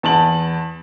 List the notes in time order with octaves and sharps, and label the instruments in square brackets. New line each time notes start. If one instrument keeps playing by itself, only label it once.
[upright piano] E2 A5 F#7